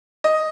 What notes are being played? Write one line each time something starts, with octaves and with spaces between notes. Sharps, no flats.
D#5